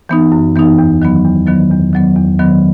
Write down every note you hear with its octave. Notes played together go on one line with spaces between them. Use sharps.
E3 B3 D#4
F#2
E3 B3 D#4
E2
D#3 F#3 B3
E2
D#3 F#3 B3
E2
D#3 F#3 B3
E2
D#3 F#3 B3